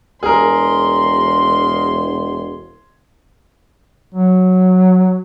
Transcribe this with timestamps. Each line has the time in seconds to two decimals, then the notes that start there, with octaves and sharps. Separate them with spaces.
0.23 E1 G#4 A#4 C6
4.14 F#3